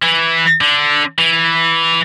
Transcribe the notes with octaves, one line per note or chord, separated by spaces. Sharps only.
E3
D3
E3